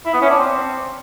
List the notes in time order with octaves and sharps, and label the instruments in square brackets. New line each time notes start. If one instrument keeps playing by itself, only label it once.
[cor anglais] E4
B3
C#4
D4
C4